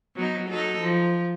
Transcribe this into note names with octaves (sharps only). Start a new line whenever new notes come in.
F#3 B3 D#4
F#3 D#4 A4
F3